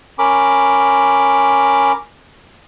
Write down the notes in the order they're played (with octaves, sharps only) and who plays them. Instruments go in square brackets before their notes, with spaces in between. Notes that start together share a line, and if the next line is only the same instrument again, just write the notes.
[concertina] C#4 A#4 B5 D6